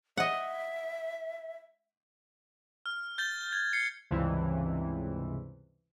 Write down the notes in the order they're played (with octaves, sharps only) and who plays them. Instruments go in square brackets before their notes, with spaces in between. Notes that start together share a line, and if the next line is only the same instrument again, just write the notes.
[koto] D#5 F#5 [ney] E5
[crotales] F6
G6 A6 G7
G#6
C7 C#7
[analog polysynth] C#2 G2 C3 E3